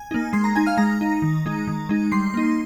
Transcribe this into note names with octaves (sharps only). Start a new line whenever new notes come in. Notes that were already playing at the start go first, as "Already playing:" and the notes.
Already playing: G#5 G#6
A#3 D#4
G#3 C6 C7
A#5 A#6
D#4 G#5 G#6
F5 F6
G#3 A#5 A#6
D#4
D#3
G#3 D#4
D#3
G#3 D#4
G3 C6 C7
A#3 D#4